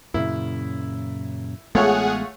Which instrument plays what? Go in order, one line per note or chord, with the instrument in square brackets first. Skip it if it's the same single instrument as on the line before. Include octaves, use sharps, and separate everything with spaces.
[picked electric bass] F#2 A#2 C#3 [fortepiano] E4
[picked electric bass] A1 G#3 B3 [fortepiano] A3 F4 C#5 [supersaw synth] G#4 F#5